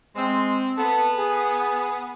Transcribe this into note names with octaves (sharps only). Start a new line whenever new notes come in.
G#3 C4
B3 A4
G#4